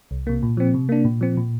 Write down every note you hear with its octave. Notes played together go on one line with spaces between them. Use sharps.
C2
C3 A#3
A#2
F3 C4
C3
A#3 D4
A#2
F3 C4
A#2